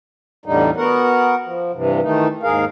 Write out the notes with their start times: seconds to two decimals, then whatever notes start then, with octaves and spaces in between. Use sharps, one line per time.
0.46 E2 A2 D3 G3 D#4
0.77 B3 F#4 A#4 F#5
1.45 F3
1.74 G2 C3 E3
2.02 D#3 E3 A3 D#4
2.43 D#2 G#2 G#4 A#4 F5